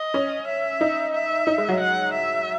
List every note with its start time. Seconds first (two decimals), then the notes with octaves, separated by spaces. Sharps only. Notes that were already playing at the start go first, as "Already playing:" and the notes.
Already playing: D#5
0.14 C#4
0.47 E5
0.81 D#4
1.13 E5
1.47 D#4
1.58 G#3
1.69 F#3
1.80 F#5
2.13 E5